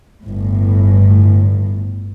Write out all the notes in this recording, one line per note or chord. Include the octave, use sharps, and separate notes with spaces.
G1 A2